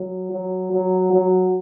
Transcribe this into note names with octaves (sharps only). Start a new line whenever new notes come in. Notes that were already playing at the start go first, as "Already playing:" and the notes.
Already playing: F#3
F#3
F#3
F#3